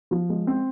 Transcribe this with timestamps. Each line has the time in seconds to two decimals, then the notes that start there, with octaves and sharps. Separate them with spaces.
0.11 F3
0.30 G#3
0.47 C4